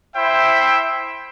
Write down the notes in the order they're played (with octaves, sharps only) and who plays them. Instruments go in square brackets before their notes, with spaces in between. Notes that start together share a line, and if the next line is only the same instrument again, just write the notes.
[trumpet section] E4 C5 E5 G5